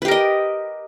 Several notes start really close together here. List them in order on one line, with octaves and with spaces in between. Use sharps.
B4 G4 A#4 D#5